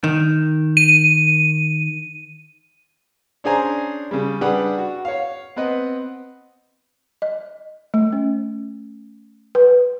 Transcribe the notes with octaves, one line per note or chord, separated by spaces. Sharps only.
D#3
D#7
C#4 D4 G#4 C5 G#5 A#5
C#3 G3
G3 D4 G4 G#4 B4 F#5
F#4
C#5 F5
B3 C4 B4 D#5
D#5
A3
C#4
B4